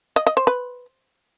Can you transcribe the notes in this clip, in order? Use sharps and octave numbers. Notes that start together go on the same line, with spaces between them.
D#5
D#5
C5
B4